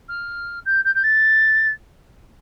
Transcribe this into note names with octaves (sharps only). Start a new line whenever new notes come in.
F6
G6
G6
G6
A6